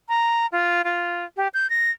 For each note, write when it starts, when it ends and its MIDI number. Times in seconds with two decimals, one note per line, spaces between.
0.09 0.46 82
0.52 0.82 65
0.84 1.25 65
1.37 1.48 67
1.54 1.69 91
1.70 1.91 94